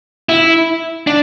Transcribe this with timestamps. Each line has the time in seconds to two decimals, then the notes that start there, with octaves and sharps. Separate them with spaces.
0.29 E4
1.07 D4